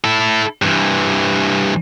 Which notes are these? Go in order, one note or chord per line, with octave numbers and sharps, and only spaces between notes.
E4 A4
G2 E3